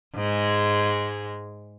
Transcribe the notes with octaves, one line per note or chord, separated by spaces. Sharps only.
G#2 G#3